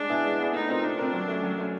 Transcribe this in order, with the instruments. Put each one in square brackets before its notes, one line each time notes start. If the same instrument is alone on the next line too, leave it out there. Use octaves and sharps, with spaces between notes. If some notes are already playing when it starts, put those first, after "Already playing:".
Already playing: [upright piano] G#3 [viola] D4
[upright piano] B3 E4 G#4
G#3
B3 E4 G#4
[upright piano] A3 [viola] D#4
[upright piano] C4 F4 A#4
[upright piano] A3 [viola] D4
[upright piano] C4 F4 A#4
F#3
A3 C#4
F#3
A3 C#4